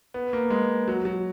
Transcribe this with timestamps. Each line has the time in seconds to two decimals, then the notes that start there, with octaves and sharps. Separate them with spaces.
0.14 B3
0.33 A#3
0.50 G#3
0.88 F#3
1.05 F#3